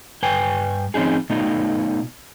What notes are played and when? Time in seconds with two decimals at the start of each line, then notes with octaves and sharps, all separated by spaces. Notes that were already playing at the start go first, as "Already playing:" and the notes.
0.23 G2 B4 G5 G#5
0.94 F3 C4 C#4 D#4 G#4
1.30 B2 A3 B3 D#4 F4